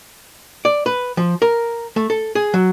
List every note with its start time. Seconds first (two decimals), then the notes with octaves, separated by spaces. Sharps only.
0.65 D5
0.86 B4
1.17 F3
1.42 A#4
1.96 A3
2.10 A4
2.35 G#4
2.54 F#3